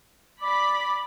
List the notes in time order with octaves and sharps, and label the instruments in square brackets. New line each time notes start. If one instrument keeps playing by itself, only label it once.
[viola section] D5 B5 [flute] D6